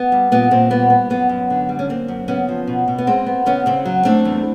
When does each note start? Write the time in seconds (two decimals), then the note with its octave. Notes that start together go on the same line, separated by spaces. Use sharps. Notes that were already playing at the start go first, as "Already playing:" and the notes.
Already playing: B3
0.12 G3
0.32 A#2 B3
0.51 A#2 C4
0.70 G3 B3
0.90 B3
1.10 F#2 B3
1.29 F#2
1.50 D3
1.69 G3
1.79 C#4
1.89 A#3 C4
2.08 F#2
2.28 C#3 B3 C#4
2.49 F3
2.67 B2
2.88 B2
2.98 B3
3.07 G#3 C4
3.26 B3
3.46 C#3 B3 C#4
3.66 C#3 C4
3.85 F#3
4.05 A3 C4 D4
4.25 E2